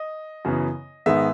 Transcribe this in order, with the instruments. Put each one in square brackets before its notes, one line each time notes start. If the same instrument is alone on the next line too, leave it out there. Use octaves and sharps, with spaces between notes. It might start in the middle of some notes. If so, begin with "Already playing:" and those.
Already playing: [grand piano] D#5
F#2 C#3 E3 B3
G#2 D#3 G#3 B3 E5